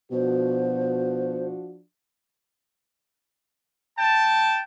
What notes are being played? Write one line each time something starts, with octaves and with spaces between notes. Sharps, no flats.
B2 F3 D4 F#4 C5
G5 A5